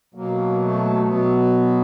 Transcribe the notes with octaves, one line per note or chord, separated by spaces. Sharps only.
B2 F#3 A#3
A3
B2 F#3 B3